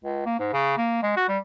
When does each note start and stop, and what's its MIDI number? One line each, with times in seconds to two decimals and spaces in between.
0.04 0.23 37
0.26 0.38 58
0.39 0.52 44
0.53 0.76 49
0.77 1.02 58
1.03 1.15 56
1.17 1.25 66
1.28 1.38 55